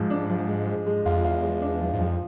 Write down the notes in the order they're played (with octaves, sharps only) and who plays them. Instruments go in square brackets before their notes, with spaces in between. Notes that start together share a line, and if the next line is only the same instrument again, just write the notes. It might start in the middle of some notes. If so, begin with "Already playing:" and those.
Already playing: [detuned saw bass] G#2 [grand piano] F3 G#3
[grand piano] D4
F3
G#3
G#3
G#3
[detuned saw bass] F2 [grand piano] F4
[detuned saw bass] E2 [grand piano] F4
[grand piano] G#3
D4
F3
[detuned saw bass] G#2
[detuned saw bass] F2 [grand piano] F3